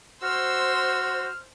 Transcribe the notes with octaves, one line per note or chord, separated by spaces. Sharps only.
F#4 C5 C6 E6 F6